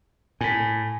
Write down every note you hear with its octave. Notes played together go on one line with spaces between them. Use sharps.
A2 G#5 B6